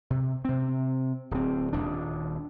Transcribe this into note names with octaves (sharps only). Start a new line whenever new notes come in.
C3
C3 C4
D1 C4
D#1 D#2 D4